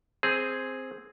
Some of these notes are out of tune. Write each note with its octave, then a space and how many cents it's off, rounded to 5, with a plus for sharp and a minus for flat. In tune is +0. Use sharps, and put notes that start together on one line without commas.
C4 +0 G#4 +0